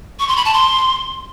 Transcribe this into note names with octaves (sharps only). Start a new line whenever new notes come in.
C#6
C6
B5
A5
C6